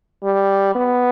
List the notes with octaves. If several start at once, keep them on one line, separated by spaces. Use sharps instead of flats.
G3
B3